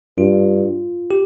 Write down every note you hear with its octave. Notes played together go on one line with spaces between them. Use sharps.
G2 F4
G4